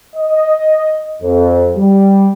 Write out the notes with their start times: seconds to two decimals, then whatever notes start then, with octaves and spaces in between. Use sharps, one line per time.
0.16 D#5
1.22 F2
1.77 G3